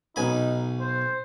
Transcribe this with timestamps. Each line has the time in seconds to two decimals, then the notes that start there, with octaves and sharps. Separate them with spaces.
0.16 B1 D#4 G#5 B5
0.81 C5